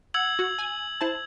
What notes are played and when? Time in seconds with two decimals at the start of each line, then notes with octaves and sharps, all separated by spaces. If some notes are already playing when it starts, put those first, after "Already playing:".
0.14 F#5 E6 G#6 F#7
0.39 F#4
0.58 G#5
1.01 E4 C5 A5